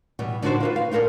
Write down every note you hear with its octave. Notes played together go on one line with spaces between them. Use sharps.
B2 E3 G3
D3 D4 D#4 F#4 C5
F4 A#4 B4
F5
D#4 E4 A4 A#4 D5